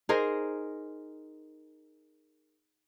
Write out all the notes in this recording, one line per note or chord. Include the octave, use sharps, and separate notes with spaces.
D#4 G#4 A#4 C5